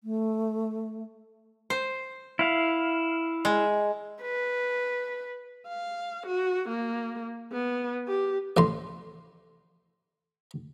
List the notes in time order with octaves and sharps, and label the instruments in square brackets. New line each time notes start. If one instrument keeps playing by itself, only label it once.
[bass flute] A3
[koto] C5
[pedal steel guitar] E4 F5
[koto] G#3
[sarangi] B4
[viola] F5
F#4
A#3
B3
G4
[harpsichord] A1 A2 C6